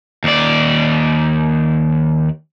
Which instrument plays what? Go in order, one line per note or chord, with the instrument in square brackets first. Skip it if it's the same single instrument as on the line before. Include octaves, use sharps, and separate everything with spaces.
[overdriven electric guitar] D#2 D5